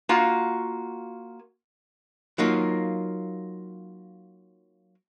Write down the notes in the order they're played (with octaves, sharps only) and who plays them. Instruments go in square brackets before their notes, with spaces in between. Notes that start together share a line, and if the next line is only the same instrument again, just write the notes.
[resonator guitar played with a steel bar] A#3 F4 F#4
[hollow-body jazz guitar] F#3 A#3 D#4 F4